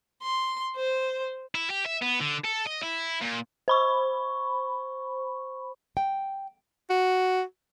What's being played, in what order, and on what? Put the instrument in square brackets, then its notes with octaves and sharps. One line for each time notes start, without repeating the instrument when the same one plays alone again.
[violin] C6
C5
[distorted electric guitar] E4
G4
E5
B3
D3
A4
D#5
E4
A#2
[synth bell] C5 B5 C#6
[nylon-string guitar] G5
[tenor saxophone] F#4